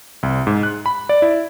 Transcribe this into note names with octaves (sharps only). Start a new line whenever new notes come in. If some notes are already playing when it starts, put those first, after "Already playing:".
C2
G#2
F#6
B5
D5
E4